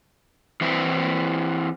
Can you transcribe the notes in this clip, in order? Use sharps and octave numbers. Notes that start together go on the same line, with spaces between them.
E3 C4 E4